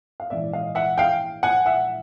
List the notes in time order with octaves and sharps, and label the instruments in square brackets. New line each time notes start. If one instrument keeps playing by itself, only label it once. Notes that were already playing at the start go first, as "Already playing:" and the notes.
[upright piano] F5
A#1 G#2 E3 D5 E5
D#5 F5
E5 F#5
F5 G5
F#5 G#5
E5 F#5